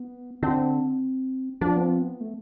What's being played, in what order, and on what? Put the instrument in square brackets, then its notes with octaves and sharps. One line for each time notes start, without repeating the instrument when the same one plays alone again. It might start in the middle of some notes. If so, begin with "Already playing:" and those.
Already playing: [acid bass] B3
[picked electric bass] D3 [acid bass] C4
[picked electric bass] F3 [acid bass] D4
[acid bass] B3
C4
B3
A3